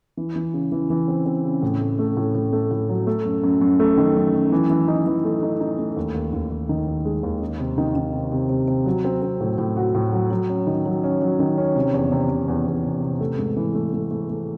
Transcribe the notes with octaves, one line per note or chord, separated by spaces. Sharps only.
E3
E3
C#3
E3
E3
C4
C4
C#3
A2
A3
A3
A2
A2
A3
A2
F#3
A3
F#2
F#2
F#2
A3
D#3
F#2
F#2
E3
E3
D#4
E3
A3
D#4
D#4
A3
D#2
D#2
D#2
D#2
D#3
D#2
G#3
D#2
D#4
C3
D#3
D#3
C3
C3
C3
C3
F#3
C4
C4
A2
A2
F#4
A2
F#3
F#3
C#4
D#3
F#3
C#4
F#3
D#3
C#4
C3
E2
C3
C3
E2
E2
C3
C3
A3
G#2
E3
A3
A3
A3
A3